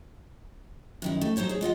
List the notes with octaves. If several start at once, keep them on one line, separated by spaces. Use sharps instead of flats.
F#2 D#3 E4
A3
F#3 D#4 C5 C#5 A5
G#4 C#5
G#3 F4 D#5 F#5